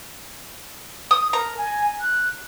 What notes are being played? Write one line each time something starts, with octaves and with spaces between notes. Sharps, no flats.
D#6
A#4 A#5
G#5
F#6